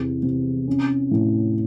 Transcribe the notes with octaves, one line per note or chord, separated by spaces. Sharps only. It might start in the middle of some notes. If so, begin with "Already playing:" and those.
Already playing: E2 C3
C3
C#4
A2